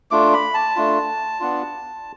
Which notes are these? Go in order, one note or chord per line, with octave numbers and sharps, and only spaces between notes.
A3 D4 F4 D6
B5
A5
A3 D4 F4
B3 D4 F4